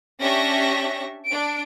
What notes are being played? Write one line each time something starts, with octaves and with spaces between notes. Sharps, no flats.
C#4 D4 G4 E5 C#6 A#6
D4 D7